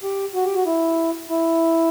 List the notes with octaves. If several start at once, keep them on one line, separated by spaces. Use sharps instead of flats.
G4
F#4
G4
F#4
E4
E4